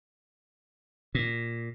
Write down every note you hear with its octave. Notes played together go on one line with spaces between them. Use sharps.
A#2